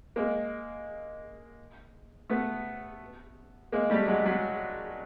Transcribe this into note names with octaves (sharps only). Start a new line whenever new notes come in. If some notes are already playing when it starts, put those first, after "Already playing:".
G#3 A#3
A3 B3
G#3 A#3
G3 A3
F#3 G#3
F#3 G#3